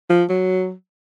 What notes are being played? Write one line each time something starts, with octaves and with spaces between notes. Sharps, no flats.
F3
F#3